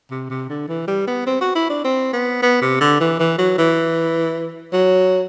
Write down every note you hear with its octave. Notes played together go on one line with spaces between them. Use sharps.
C3
C3
D3
E3
G3
B3
C4
F#4
E4
D4
C4
B3
B3
C3
D3
E3
E3
F#3
E3
F#3